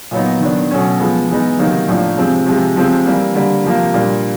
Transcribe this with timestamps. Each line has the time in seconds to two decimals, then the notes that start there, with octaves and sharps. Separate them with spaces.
0.11 A#2 F#3 B3 D#4
0.41 D#3 F#3 B3 D4
0.71 B2 F#3 A3 C#4
1.00 F3 G#3 B3
1.29 E3 G#3 B3 D#4
1.59 C3 D#3 F#3 A#3 D#4
1.88 A2 F3 A#3 D4
2.17 C3 F3 G#3 C4
2.46 C3 F3 G#3
2.76 C3 F3 G#3 C4
3.06 E3 G3 A#3
3.35 D3 G3 A#3
3.64 C3 F3 A#3
3.94 A#2 G3 A#3 D4